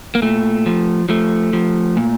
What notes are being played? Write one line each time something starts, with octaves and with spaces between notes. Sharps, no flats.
A#3
A#2 A3
F3
F3 A3
F3
A#2